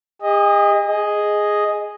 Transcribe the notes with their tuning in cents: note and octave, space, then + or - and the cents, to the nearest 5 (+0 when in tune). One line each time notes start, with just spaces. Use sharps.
G#4 -45 D#5 +0
G#4 +0 D#5 +0